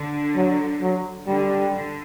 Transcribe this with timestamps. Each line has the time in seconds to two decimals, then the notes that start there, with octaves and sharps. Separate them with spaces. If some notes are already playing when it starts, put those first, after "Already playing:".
Already playing: D3
0.36 F#3
0.82 F#3
1.28 D3 G3
1.73 D3